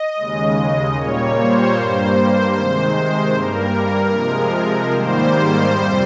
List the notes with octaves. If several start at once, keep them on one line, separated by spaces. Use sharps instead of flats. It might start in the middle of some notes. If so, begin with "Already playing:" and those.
Already playing: D#5
D#2 C#3 G#3
A#2 G3 A#3 C#5
C5
G2 G3 A#3 C5
C3 D#3 G#3
G2 G3 A#3 A#4
C3 F3 G#3
G#2 D#3 G3 A#3 C5
F2 C3 G3